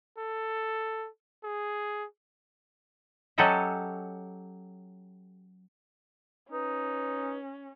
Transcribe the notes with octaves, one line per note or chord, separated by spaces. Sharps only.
A4
G#4
F#3 C#4 G4 A4 D#5 E5
C#4 D#4 B4